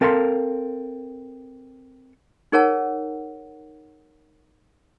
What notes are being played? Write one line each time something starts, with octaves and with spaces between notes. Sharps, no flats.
C4 A4 A#4 F5 G#5 C6
D#4 G#4 A#4 C#5 F#5 A5